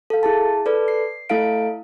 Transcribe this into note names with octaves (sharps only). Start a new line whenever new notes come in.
A4 F5
E4 G#4 A5
A4 B4 D5
C7
A3 E4 A4 F5 D7